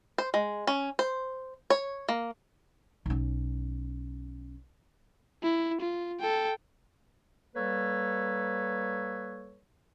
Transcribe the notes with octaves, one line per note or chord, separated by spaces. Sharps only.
C5
G#3
C#4
C5
C#5
A#3
B1 C#4
E4
F4
A4 G5
G3 A#3 A4 B4 C#5